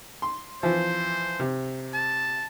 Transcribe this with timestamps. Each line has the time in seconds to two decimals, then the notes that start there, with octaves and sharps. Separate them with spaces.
0.22 C6
0.63 E3 F3 C4 C5
1.40 C3
1.94 A5